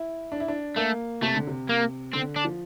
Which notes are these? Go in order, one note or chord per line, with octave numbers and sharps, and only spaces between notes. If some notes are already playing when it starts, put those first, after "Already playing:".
Already playing: E4
D4
E4
D4
A3 A#3
C3 A3
D3
C3
A#3
D3 C4
D4
F3